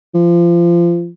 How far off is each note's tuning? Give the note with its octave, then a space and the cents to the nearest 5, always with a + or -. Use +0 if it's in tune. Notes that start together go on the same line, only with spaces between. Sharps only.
F3 -25